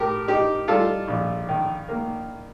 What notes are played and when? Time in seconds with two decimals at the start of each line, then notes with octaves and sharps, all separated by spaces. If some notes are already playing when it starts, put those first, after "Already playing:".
Already playing: A2 G4 A#4
0.28 D#4 G4
0.68 G3 F4 A4
1.08 A#1
1.48 D#3
1.89 A#3